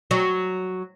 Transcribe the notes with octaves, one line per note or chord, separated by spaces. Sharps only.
F#3